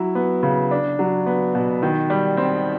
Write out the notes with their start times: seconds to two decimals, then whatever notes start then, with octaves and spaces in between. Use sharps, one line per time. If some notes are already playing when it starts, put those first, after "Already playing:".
Already playing: F#3 E4
0.15 B3
0.43 C#3
0.71 D4
0.99 F#3
1.26 B3
1.55 B2
1.83 D#3
2.10 G3
2.37 C4